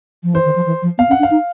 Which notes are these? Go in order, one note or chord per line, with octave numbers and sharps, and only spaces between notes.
F3
E3 C5
D#3
F3
E3
F3
B3 F5
C#4 F#5
D4
F5
D#4